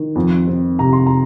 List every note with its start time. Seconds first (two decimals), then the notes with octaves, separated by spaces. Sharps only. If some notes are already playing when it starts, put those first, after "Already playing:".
Already playing: D#3
0.15 F2
0.47 C4
0.79 C3 A#5
0.93 C6
1.07 A#5